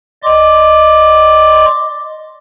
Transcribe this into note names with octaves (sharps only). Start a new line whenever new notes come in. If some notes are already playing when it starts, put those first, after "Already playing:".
D5 D#5 C6 D6